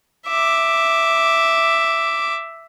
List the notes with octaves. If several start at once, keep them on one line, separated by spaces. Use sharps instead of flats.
E5 D6